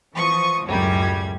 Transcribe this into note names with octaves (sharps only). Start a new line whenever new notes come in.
E3 F3 C#6 D#6
C#2 F#2 A2 G3 G#6